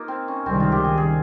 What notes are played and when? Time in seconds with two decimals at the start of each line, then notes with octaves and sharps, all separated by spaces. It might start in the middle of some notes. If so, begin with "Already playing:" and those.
Already playing: A#3 D#4 F4
0.08 C4
0.28 C#4
0.46 C#2 C3 D#3 G3 C4
0.60 F4
0.72 G4
0.84 G#4
0.98 G#4